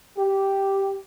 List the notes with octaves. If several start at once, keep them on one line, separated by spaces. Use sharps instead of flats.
G4